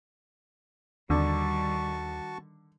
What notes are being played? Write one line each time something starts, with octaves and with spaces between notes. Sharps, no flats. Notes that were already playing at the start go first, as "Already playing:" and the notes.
D#2 D3 D#3 G3 F#4 A5 C#6